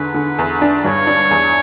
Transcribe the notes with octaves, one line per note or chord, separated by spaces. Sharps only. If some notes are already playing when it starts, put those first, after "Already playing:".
Already playing: E2 D3 B4
D3
E2
D4
G2 C#5
D4
E2